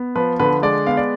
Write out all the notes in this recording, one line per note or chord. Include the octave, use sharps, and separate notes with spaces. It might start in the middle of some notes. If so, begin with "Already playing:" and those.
Already playing: B3
F3 B4
D3 B4
G#3 D5
B3 F5
D5